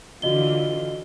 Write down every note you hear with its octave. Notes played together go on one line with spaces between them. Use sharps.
D3 E3 F4 F#4 D#5 G7